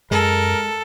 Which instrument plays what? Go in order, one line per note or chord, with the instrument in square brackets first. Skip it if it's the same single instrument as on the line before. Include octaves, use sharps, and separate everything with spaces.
[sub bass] F#2 [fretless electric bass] G#3 [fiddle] A4 [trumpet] A#4